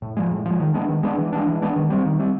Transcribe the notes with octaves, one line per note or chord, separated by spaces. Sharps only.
A2
F3 G#3
A2
F3 G#3
D#3
G#3 B3 D4
D#3
G#3 B3 D4
E3
G#3 B3 D4
E3
G#3 B3 D4
D#3
G3 C4
D#3
G3 C4